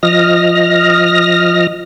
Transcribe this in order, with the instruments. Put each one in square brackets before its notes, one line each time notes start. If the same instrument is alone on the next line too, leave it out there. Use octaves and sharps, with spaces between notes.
[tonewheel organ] F3 D#5 F6 A#6